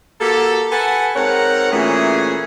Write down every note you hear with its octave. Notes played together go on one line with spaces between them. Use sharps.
A#3 F#4 G4 A4
A4 B4 F#5 G#5 A5 B5
G#2 C4 A#4 C#5 F#5 A#5
A#2 E3 A3 C#4 G#4